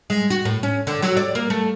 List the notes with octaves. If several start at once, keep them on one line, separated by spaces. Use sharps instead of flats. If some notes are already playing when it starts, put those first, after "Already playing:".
G#3
F#4
A2
C#4
D3
F#3
D5
A#3
A3